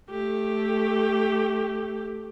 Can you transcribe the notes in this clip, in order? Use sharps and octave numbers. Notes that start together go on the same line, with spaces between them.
A3 G4